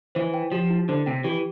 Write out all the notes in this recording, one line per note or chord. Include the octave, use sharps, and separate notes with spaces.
E3 C5
G5
F3 G4
E4
D3 C5
C3 G5
E3 G4